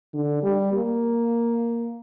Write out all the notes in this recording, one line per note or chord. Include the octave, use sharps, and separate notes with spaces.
D3
G3
A#3